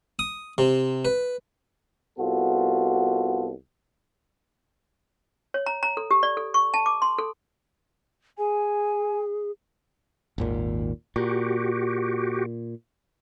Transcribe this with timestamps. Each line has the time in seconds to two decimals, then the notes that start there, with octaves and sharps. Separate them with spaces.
0.19 D#6
0.58 C3
1.05 B4
2.19 C2 B3 F4 F#4 A4
5.54 C#5
5.66 A#5
5.83 A#5
5.97 A4
6.11 G4
6.23 D5
6.37 A4
6.54 C#6
6.74 A5
6.86 D6
7.02 C6
7.18 A4
8.38 G#4 G#5
10.38 G#1 D#2 A#2
11.16 A#2 F#4 G4